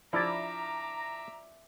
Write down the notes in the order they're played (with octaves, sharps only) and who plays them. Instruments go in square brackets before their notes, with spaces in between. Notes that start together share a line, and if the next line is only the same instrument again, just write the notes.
[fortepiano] F3 D4 [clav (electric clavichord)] E4 D5 [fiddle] E5 D6 [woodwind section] A#5